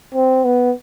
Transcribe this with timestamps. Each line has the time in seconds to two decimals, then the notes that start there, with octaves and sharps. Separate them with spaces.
0.15 C4
0.45 B3